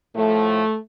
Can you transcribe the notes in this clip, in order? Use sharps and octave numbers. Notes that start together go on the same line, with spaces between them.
A2 F3 A3